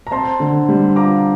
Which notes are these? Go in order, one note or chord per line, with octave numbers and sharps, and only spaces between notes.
A#5
C4 A5 C6
D3
G3
F4 A#5 D6